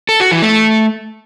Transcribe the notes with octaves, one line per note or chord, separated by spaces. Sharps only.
A4
F#4
E3
A3